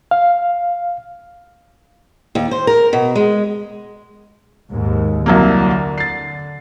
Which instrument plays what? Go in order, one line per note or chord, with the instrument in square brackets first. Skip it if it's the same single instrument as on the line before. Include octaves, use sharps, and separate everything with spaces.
[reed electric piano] F5
[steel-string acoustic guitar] D#2
C5
A#4
B2
G#3
[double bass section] D#2 G#2
[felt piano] C2 F#3 A#3 [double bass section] D3
[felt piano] A6 C7